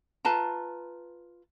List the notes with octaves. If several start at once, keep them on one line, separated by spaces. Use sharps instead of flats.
F4 B4 A5 A#5